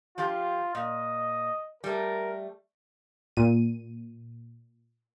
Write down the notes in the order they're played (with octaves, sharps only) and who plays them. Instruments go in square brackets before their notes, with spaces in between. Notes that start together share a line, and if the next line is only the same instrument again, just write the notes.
[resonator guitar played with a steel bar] F3 G4 [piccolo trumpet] F4
[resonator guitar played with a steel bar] A#2 [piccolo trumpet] D#5
[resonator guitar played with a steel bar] G3 A3 [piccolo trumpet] A#4
[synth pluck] A#2 D#7